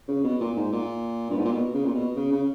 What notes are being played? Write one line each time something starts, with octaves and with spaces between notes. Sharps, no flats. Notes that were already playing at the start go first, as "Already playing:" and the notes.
C#3
B2
A#2
G#2
A#2
G2
G#2
A#2
B2
C#3
A#2
B2
C#3
C#3